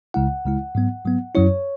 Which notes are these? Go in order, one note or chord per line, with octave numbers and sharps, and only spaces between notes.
C#2 C#3 G#3 E4 F#5
C#2 C#3 G#3 E4
G#2 F#3 B3
G#2 F#3 B3
F#2 F#3 C#4 E4 C#5